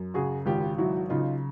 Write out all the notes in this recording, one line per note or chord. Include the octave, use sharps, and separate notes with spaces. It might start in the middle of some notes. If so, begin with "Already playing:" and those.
Already playing: F#2
C#3 F#4 G#4
G#1 F4 G4
F#3 E4 F#4
C#3 D#4 F4